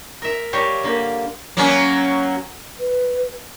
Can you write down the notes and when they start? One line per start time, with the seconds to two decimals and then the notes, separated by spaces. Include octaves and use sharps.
0.22 A#4 E5
0.53 G3 G4 A#4 C#5 F5
0.84 D3 A#3 G4
1.57 F#3 A#3 C#4
2.80 B4